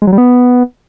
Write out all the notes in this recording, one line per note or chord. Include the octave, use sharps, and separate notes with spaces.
G#3
F#3
G3
B3